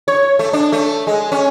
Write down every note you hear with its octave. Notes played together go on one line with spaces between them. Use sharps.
C#5
A3
D4
A3
G#3
C#4